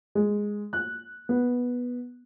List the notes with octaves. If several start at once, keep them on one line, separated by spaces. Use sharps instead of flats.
G#3
F#6
B3